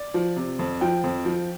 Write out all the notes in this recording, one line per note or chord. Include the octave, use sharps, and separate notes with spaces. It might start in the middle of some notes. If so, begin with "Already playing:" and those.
Already playing: D5
F3
C3
F2
F3 G5
F2
F3